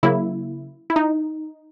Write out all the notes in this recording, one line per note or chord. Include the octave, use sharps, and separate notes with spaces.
C#3 F#3 A#3 E4
E4
D#4